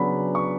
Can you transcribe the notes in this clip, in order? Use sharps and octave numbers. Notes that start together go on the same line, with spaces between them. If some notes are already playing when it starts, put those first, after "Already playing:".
Already playing: C#3 F#3 B3 D4 B5
C#6